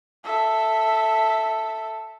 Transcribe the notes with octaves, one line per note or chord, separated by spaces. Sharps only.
A4 E5